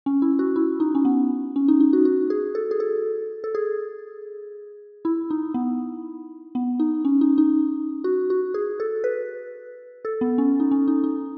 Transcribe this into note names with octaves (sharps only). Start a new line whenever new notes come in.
C#4
E4
F#4
E4
D#4
C#4
B3
C#4
D#4
D#4
F#4
F#4
G#4
A4
G#4
A4
A4
G#4
E4
D#4
B3
B3
D#4
C#4
D#4
D#4
F#4
F#4
G#4
A4
B4
A4
B3
C#4
D#4
C#4
D#4
D#4